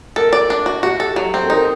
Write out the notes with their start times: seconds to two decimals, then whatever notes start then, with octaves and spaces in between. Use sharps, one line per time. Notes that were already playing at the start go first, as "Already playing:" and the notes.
0.16 A4 A#4
0.33 D5
0.50 D4
0.66 F#4
0.83 F#4 G4
1.00 A4
1.16 F#3
1.34 C4
1.44 A4
1.50 D#4 A#4